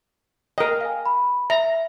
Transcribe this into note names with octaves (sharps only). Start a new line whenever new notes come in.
A#4 D#5 G5
F5 G#5
B5
E5 A#5